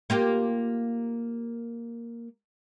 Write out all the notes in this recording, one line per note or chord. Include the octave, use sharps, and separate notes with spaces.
A#3 F4 G4